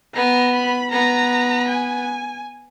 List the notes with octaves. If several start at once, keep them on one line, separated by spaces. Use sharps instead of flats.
B3 A#5
B5
B3 A#5
G#5